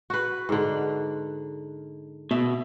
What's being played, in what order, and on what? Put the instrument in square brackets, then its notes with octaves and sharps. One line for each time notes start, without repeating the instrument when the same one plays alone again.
[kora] F#4 B4
G#2 D3
[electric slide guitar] B2 [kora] E5